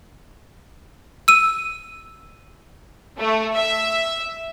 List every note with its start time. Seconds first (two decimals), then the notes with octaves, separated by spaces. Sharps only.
1.28 E6 D#7
3.18 A3
3.55 E5